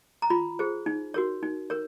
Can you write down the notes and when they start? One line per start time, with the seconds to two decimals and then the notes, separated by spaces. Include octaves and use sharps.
0.22 A#5
0.30 F4 B5
0.59 G#4 C5
0.86 D#4
1.14 F#4 A#4 C#5
1.43 D#4
1.70 A#4 C#5